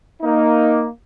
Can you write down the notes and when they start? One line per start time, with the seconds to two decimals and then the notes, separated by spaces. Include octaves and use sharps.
0.22 A#3 D#4